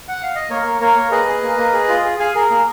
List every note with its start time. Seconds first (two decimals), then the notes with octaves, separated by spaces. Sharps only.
0.08 F#5
0.23 F5
0.35 D#5
0.50 A#3 A#4 C#5
0.65 A#3
0.80 A#3 A#4 C#5
0.97 A#3
1.11 G#4 B4 D#5
1.28 G#4
1.43 A#3
1.57 A#3
1.73 G#4
1.89 F4
2.04 G#4
2.19 G#4 F5 G#5
2.35 G#4 A#4
2.51 A#3